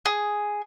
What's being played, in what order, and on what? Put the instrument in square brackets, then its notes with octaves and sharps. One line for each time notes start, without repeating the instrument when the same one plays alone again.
[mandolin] G#4